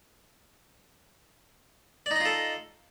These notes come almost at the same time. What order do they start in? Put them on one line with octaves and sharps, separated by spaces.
D5 D#4 D#5 F4 A4